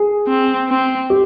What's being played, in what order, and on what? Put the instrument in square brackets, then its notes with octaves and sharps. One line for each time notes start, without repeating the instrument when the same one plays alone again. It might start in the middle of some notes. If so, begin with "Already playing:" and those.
Already playing: [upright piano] G#4
[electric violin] C4
C4
[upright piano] G4